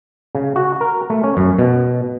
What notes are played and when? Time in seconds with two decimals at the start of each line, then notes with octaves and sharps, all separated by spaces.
0.35 C#3
0.56 F#4
0.81 A#4
1.10 A3
1.24 C#4
1.37 F#2
1.59 B2